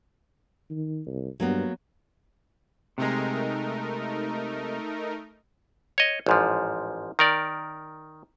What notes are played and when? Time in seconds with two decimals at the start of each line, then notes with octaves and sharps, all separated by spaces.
0.70 D#3
1.06 C2
1.40 G2 F#3 A#3 B3
2.98 C3 G#3 A3 D#4 A#4
5.98 C#5 D#5
6.26 A1 G#2 F3
7.19 D#3 A#4 D5